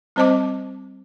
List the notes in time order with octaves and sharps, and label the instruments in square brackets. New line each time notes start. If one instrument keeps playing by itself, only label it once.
[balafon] G3 C4 C5 D#5 A5 D6